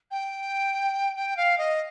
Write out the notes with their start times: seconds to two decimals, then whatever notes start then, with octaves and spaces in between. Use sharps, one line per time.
0.11 G5
1.16 G5
1.37 F5
1.58 D#5